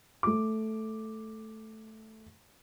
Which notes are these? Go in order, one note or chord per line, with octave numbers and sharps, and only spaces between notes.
A3 D6